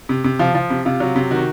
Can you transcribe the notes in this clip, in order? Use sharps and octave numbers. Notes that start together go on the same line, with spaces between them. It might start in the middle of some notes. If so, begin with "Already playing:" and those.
C3
C3
F3 F4
F3
C3
C3 F4
F#3
C3
D#3 F#4